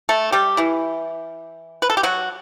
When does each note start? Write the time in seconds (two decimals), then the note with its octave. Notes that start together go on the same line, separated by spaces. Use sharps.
0.09 A3 A4
0.32 G3 G4
0.57 E3 E4
1.82 B4
1.90 A4
1.97 G4
2.03 F#3 F#4